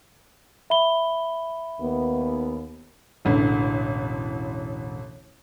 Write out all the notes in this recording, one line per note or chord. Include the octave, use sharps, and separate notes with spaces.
E5 B5 G7
D#2 B3
E1 A1 D3